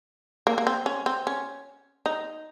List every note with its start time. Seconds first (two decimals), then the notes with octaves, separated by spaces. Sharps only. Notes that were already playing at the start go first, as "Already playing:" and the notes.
0.47 A#3
0.58 A#3
0.67 C4
0.86 C#4
1.06 C4
1.27 C#4
2.06 D#4